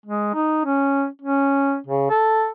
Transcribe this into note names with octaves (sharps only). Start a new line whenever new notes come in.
G#3
D#4
C#4
C#4
C#3
A4